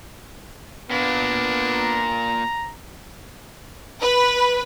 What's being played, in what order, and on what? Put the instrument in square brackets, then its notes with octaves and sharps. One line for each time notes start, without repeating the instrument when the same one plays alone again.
[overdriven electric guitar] A#2 A#3 [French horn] B3 [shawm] D4
[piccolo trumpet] A#5
[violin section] B4